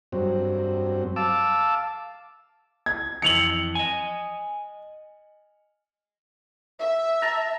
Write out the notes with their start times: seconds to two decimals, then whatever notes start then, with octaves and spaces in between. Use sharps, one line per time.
0.12 G2 F#3 C4
1.16 F5 A5 D6 E6
2.86 G#6
3.22 F2 E3 C#7 F7 F#7
3.75 D#5 G#5
6.80 E5
7.22 A5 A#5